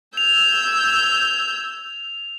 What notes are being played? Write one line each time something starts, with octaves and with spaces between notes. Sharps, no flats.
E6 G6 G#6 F7